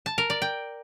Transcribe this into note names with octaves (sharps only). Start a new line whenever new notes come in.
A5
A#4
D5
G5